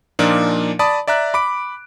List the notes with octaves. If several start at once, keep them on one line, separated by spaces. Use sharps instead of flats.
A#2 F3 A#3 D4 D#4
D5 A5 B5 D#6
D5 E5 A#5 F#6
B5 D6 D7